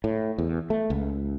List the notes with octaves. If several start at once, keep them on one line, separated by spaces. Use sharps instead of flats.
A2
E2
A3
C#2